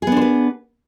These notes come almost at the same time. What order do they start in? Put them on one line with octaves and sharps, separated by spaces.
G#4 B3 D4 C5 B4